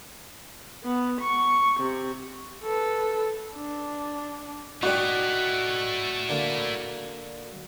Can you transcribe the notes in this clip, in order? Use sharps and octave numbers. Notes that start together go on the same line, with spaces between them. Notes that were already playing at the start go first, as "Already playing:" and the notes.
B3
C#6
C3
A4 B4
D4
A3 D#4 E4 F#4 G4 D5
D3 A#3 D4